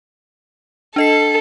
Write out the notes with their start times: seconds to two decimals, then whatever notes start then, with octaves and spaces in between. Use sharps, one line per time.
0.96 D4 A4 D#5 C7